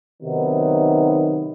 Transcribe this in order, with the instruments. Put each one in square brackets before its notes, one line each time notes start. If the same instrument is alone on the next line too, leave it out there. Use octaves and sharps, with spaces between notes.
[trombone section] C3 D#3 F#3 B3 D#4